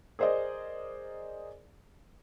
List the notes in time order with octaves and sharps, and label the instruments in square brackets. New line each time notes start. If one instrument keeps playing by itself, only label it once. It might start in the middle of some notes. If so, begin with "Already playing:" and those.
[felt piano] G#4 A#4 C5 D5 D#5